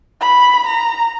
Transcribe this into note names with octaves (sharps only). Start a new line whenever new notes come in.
B5
A#5